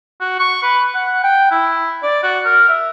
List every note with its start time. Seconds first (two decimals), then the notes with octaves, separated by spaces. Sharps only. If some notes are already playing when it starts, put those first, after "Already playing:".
0.21 F#4
0.39 C#6
0.63 B4
0.95 F#5
1.23 G5
1.51 E4
2.03 D5
2.23 F#4
2.45 A#4
2.68 E5